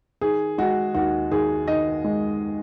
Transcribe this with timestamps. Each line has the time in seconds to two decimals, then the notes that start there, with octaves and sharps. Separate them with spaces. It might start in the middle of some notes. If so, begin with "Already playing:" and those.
0.21 D#3 G#4
0.58 G#3 F#4
0.95 D#2 F#4
1.31 D#2 G#4
1.68 D#3 D#5
2.04 G#3